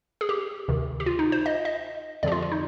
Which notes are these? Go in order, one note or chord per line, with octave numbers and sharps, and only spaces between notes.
G#4
G4
D2 C3 D#3
G4
F4
D#4
C5
D#5
D#5
F2 D3 F3 G4 D5
F4
F4
D#4